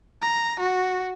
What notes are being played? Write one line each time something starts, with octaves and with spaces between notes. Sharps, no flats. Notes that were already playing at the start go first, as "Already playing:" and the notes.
A#5
F#4